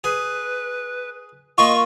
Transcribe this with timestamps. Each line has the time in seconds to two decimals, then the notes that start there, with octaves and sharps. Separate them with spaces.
0.04 G#4 B4
1.58 A#3 F4 D#5 C#6